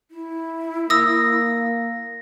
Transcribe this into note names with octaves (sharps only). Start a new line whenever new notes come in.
E4
A#3 D#6 E6 A#6